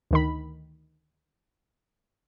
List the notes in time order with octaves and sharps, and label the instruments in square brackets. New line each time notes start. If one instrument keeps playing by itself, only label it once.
[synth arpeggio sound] D2 D#3 B5